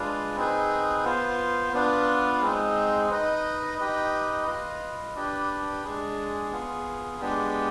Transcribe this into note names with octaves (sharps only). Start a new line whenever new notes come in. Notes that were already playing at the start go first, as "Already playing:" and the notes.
Already playing: G#3 D4 F4 B4
C4 D#4 G#4 B4
B3 F4 C5
B3 D4 F4 B4
G#3 C4 D#4
D#4 B4 D#5
D#4 G4 B4 D#5
F4 B4 D#5
D4 G4 B4
G#3 D4 G#4
B3 F4 G#4
G#3 B3 D4 G4